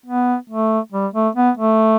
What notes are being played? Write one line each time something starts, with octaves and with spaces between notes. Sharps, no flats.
B3
A3
G3
A3
B3
A3